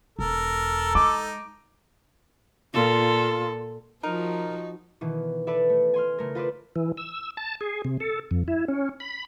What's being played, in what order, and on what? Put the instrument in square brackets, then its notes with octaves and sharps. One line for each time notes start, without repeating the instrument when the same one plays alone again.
[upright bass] E1 [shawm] A4 [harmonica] A#4
[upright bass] G#3 [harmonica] D#4 [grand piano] D6
[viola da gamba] A#2 A4 [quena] F4
[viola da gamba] F3 F#4 [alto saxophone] D#4 [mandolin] A#4
[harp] B2 D#3 E3
A4 B4 D5 E5
A3
G#5 C6 F6
C#3 A3 A#4
F4 B4 C5 D5
[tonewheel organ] E3
E6
A5
G#4
C3
A4
F2
E4
C#4
B5